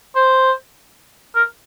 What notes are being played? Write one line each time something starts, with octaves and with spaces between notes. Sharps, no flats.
C5
A#4